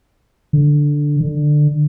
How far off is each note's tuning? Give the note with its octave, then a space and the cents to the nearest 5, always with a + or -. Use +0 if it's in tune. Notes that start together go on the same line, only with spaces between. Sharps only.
D3 +0
D3 +15